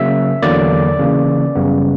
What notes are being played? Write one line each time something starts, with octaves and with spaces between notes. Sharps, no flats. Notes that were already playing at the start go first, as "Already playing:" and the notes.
Already playing: C#3 F#3 A#3 E5
E2 D3 F#3 A#3 D5
C#3 E3 A#3
F#2 C#3 G3 B3